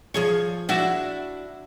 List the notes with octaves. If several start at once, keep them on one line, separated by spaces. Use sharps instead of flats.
F3 G#4 C#5
D4 E4 F#4